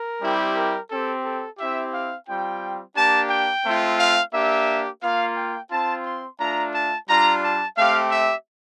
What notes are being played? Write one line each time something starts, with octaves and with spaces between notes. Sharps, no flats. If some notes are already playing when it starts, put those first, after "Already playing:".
Already playing: A#4
G3 C4 E4 G4
A#4
C4 G4 A4
A4
C4 E4 G4 E5
F5
G3 C4 F4 G5
A#3 D4 G4 A5
G5
A3 C4 F4
F5
A#3 D4 G4 E5
A#3 F4 F5
G5
C4 F4 A5
C6
A3 D4 F4 A#5
A5
G3 D4 F4 A#5
A5
A3 C4 G4 F5
E5